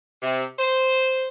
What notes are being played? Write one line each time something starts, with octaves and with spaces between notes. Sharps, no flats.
C3
C5